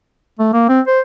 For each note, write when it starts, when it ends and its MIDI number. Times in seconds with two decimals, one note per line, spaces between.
0.39 0.49 57
0.53 0.68 58
0.69 0.81 60
0.87 1.01 72